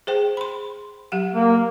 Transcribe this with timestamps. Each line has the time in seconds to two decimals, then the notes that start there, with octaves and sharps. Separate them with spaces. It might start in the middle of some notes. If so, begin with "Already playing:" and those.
0.07 G#4 C5 G5
0.37 B5 C6
1.12 F#3 G4 F#5
1.35 A#3